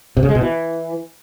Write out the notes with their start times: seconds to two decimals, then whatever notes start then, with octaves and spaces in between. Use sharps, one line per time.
0.17 C3
0.23 C#3
0.29 G#3
0.35 B2
0.41 E3